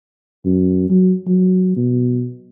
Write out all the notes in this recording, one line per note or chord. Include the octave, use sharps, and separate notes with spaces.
F#2
F#3
F#3
B2